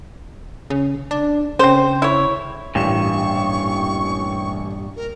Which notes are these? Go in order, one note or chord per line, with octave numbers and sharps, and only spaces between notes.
C#3
D4
C#3 C4 C5
E4 C#5
A1 G2 A#2 C#6 E7
A#4